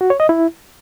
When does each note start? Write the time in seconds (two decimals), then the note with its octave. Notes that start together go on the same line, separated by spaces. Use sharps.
0.01 F#4
0.10 C#5
0.20 D#5
0.29 E4